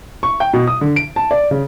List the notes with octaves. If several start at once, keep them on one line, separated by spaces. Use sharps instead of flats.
C#6
G5
B2
D#6
D3
D7
A5
D5
C#3